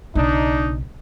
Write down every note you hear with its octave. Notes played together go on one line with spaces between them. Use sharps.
B1 C#3 D4 D#4